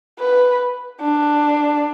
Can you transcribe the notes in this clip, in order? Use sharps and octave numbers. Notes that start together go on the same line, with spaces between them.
B4
D4